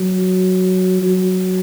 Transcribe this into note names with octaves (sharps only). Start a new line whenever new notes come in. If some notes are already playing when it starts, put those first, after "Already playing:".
Already playing: F#3
F#3